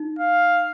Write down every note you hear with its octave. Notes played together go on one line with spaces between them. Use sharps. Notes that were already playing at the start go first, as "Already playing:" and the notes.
Already playing: D#4
F5